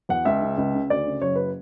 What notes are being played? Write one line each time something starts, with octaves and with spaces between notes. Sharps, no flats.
E2 F#5
C#2 E5
C#3
C#2
C#3
D2 D5
C#3
F#1 C#5
B4